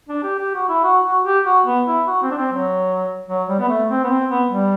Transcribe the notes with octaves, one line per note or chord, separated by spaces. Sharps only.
D4
G4
G4
F#4
E4
F#4
F#4
G4
F#4
B3
E4
F#4
C4
D4
C4
F#3
F#3
G3
B3
A3
C4
B3
C4
B3
G3